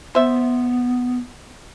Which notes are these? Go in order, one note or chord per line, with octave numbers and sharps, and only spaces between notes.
B3 C5 E5